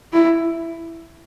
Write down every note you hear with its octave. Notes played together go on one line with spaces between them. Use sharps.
E4